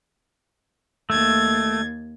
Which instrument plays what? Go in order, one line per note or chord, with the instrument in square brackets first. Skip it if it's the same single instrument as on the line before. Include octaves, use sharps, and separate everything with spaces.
[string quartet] D#2 G#6 A6 [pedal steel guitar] A3